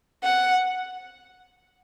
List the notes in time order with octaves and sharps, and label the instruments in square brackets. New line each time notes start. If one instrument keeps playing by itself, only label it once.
[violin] F#5